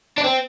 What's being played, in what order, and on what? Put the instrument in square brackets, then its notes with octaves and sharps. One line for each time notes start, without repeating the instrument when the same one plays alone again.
[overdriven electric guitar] D4
C4